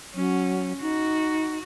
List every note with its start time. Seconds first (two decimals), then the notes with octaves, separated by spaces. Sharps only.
0.15 F#3 C#4
0.81 D#4 F#4